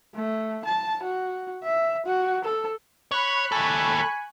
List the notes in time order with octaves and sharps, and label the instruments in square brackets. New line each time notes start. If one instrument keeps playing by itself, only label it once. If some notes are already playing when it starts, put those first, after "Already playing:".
[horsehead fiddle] A3
A5
F#4
E5
F#4
A4
[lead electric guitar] C#5 [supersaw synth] B5 C#6 F#6
[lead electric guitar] D#2 A4 [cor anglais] G#5